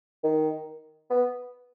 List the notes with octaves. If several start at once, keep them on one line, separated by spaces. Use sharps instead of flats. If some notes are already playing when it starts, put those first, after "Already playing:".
D#3
B3